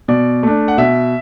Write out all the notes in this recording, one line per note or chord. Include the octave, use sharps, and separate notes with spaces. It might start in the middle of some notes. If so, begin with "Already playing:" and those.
B2 D5
A3 D4
F#5
B2 E5